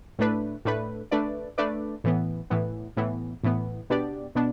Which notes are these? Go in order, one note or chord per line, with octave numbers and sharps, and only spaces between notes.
A2 A3 D4 B4
A2 A3 D4 B4
A3 D4 B4 D5
A3 D4 B4 D5
A2 E3 B3
A2 E3 B3
A2 E3 B3
A2 E3 B3
B2 B3 D4 G4 D5
B2 B3 D4